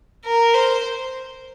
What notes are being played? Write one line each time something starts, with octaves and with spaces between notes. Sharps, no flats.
A#4
C5